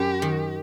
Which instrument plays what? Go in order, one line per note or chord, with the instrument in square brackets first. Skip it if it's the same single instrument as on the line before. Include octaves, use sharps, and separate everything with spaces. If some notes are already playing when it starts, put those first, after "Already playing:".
Already playing: [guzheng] F#2 F#3 [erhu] G4
[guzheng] D#3